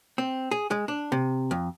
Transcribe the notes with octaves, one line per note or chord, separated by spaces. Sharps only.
C4
G#4
G#3
D4
C3
F2